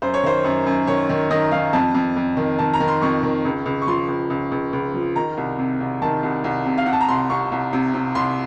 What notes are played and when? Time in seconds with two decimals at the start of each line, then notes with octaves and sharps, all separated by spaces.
0.02 F#2 C5
0.14 C#5
0.24 D#3 C5
0.44 F#2
0.66 F#2
0.87 D#3 C#5
1.09 D#3
1.31 D#3 D#5
1.52 D#3 F5
1.73 F2 A5
1.95 F2
2.16 F2
2.37 D#3
2.59 D#3 A5
2.73 A#5
2.80 D#3
2.88 C6
3.02 F2 C#6
3.23 D#3
3.45 C#2
3.66 C#2
3.82 C#6
3.87 F3 C6
4.08 C#2
4.30 C#2
4.51 C#2
4.73 C#2
4.94 F3
5.16 D#3 A#5
5.37 C2
5.58 C3
5.80 C2
6.02 D#3 A5
6.23 C2
6.44 C2
6.66 C3
6.78 F5
6.86 C3 F#5
6.93 A5
7.01 A#5
7.08 C2 C6
7.30 C2 C#6
7.52 C2
7.73 C3
7.94 C3
8.15 C2 C6